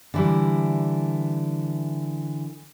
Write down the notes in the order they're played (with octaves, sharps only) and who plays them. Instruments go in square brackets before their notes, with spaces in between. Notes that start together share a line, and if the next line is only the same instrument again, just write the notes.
[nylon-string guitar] D3 E3 G3